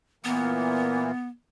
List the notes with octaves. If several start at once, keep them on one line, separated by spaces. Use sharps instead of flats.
A#2 E3 A#3 B3